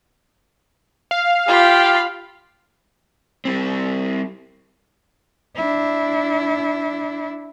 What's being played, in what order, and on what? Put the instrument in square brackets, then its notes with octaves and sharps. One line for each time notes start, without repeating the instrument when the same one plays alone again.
[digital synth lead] F5
[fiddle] F4 B5 [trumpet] G4
[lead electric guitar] G3 C4
[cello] D4 E4